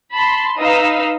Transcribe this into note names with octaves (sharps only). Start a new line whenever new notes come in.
A5 B5 C6
D#4 B4 D#5 F5 E6